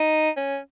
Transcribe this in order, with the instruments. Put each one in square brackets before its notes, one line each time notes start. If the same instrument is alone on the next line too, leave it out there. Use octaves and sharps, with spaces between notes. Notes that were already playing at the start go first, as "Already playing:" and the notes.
Already playing: [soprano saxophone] D#4
C#4